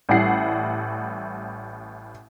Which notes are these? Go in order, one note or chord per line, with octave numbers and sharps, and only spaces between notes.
A1 A2 G3 E4 F#5 C7